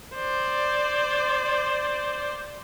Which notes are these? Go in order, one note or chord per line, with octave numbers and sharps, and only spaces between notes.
C5 D5